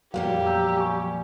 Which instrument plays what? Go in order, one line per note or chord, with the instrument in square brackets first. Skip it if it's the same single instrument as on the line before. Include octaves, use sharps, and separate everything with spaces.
[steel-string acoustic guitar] F2 A#2 G3 [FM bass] F#3 [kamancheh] G4 [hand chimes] A#4 F5
[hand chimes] A#5 E6 G6
G#5 C#6